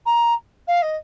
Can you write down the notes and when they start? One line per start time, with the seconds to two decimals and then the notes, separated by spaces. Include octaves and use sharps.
0.06 A#5
0.67 F5
0.82 D#5